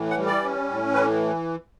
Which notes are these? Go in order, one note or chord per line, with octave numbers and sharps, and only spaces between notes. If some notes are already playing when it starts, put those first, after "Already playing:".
Already playing: A2 E3
F#5
G3
D5
C#4
A2
E3 B4